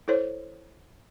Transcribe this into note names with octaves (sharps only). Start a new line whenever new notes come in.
E4 A4 C5 C#5